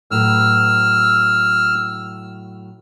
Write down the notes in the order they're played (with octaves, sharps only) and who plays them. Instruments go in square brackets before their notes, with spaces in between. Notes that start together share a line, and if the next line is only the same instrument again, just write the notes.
[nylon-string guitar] A2 F#3 B4 [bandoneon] E6 F6